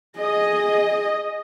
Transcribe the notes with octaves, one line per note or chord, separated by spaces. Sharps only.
G#4 D#5